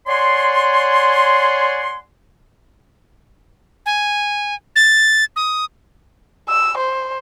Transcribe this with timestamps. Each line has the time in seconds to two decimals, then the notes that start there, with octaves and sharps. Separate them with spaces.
0.07 C#5 D5 F#5 G#5 C6
3.86 G#5
4.76 A6
5.36 D#6
6.49 E6
6.78 C5